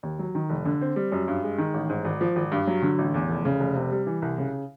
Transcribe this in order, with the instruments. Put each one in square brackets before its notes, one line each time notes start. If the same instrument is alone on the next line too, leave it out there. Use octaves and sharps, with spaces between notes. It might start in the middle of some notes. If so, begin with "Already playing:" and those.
[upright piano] D#2
F#3
D#3
F1
D3
C4
G3
F#2
G2
G#3
D#3
A1
G#2
G#1
F3
G#1
G2
F#3
D3
A1
E2
F1
C#3
F1
C3
G3
E3
C2
C#3